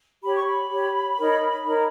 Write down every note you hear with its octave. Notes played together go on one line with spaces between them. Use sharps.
G4 C#5 B5
C#6
B5
G4 C#5
D#4 A#4 C#5
D#4 A#4 C#5